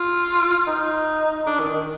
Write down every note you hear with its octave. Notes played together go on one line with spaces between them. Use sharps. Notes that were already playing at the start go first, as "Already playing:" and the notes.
Already playing: F4
D#4
D4
D#3
D#3